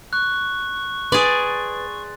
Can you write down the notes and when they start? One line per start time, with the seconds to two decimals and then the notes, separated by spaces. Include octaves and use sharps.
0.13 C#6 F#6
1.12 G#4 B4 D5 C6 A6